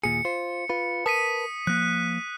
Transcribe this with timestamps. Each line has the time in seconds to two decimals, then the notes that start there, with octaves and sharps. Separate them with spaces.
0.04 D#2 A#2 G#4 C#7
0.25 F4 C5
0.69 F4 B4
1.06 A#4 B4 A5 D#6 B6 D#7
1.67 F3 A#3 F#6